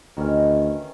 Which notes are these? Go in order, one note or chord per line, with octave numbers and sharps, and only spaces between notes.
D2 D#3 E3 C#4